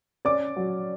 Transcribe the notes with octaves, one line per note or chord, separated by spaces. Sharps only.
C#4 D5 D6
F#3